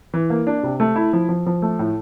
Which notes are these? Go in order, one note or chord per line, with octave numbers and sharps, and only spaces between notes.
E3
A#3
D4
C3
A3
E4
F3
F3
F3
A3
A2